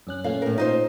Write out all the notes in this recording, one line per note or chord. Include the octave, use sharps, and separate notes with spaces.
F#2 C#4 F#6
A#2 A3 C#4 F5
A2 A#4
D#4 F4 C5